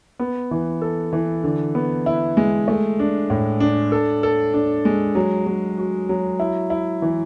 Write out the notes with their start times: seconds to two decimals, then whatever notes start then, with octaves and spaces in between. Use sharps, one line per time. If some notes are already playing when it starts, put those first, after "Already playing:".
0.19 B3
0.51 E3
0.82 A4
1.13 E3
1.44 D3
1.75 B3
2.06 E4
2.37 G#3
2.68 A3
2.99 D4
3.30 A2
3.60 D4
3.92 A4
4.23 A4
4.54 D4
4.85 G#3
5.15 F#3
5.47 F#3
5.78 F#4
6.09 F#3
6.40 E4
6.70 E4
7.02 E3